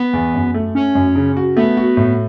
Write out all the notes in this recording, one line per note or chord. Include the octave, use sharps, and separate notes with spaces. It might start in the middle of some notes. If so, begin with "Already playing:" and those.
Already playing: B3
E2
F#2
A3
A3 C#4
F#2
C#3
F#4
A3 B3
F#4
A2